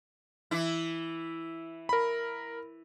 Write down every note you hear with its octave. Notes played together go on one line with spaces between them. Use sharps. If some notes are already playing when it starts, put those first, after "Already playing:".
E3 E4
A#4 B5